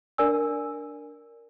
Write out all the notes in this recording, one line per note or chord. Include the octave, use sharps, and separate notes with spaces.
D4 A#4 D5 G#5 E6